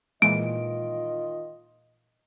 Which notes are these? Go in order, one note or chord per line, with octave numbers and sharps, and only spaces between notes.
A#2 D#3 E3 G#3 F4 D#5 D7